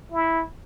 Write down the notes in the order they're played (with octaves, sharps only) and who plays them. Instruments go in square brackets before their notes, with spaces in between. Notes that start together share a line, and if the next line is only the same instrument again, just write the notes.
[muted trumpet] E4